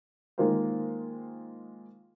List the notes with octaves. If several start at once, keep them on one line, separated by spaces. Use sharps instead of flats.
D#3 G#3 A#3 F4 A#4 C5